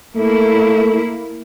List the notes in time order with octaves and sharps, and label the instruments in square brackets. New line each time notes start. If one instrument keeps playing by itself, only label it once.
[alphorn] A3 [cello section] A#3 E4